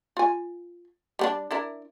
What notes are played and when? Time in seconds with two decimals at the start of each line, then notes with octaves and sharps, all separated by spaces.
0.17 F4 G#5
1.19 G3 B3 D4
1.51 D4 E4 A#4